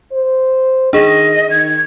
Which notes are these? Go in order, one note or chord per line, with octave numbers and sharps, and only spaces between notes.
C5
D#3 D4 G#4 D#5
D#3 G#6